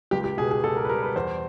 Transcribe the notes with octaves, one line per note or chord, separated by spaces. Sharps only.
C#2 G4
G4
B2 G#4
G#4
B2 A4
A#4
B4
G3 A#4
B4
E2 C5